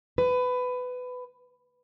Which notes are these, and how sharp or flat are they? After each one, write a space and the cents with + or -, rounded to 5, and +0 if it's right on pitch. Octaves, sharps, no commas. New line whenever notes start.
B4 +20